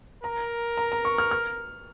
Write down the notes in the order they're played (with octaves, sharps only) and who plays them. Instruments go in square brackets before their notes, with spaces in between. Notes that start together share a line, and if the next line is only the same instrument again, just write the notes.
[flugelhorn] A#4 [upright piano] A#5
[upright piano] A#5
A#5
C#6
F6
F6